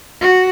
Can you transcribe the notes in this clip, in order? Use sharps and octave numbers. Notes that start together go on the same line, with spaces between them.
F#4